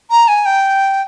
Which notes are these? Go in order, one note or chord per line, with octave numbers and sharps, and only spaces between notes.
A#5
G#5
G5